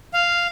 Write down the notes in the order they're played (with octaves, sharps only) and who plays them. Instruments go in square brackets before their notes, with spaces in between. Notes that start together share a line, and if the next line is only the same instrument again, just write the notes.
[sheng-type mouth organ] F5